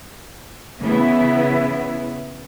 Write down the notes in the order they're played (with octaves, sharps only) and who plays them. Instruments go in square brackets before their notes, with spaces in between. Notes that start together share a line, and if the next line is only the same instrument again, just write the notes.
[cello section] C#3 E3 B3 E4